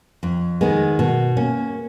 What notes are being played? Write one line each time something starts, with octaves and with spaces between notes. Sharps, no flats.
F2
D#3 G#3 B3
B2
A#3 C#4